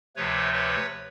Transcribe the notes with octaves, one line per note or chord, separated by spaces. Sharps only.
D2 C3 F3 A3 B4 C#5
B4 C#5